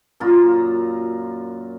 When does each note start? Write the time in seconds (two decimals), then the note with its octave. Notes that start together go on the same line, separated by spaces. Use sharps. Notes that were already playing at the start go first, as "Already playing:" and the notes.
0.20 F#2 A#2 F4 A#5